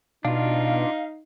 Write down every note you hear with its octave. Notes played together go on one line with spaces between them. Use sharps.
B2 D4 D#4 F4 F5